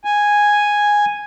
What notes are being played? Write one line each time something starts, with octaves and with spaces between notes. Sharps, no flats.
G#5